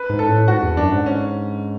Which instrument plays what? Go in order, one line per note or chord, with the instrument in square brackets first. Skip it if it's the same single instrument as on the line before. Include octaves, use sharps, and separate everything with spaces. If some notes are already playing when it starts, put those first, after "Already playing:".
Already playing: [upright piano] B4
[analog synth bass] G#2
[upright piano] A4
[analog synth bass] A2
[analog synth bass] G#2 [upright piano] F#4
[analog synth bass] E2
[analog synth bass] F#2 [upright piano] D4
[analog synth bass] G#2
[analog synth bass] G#2 [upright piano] C#4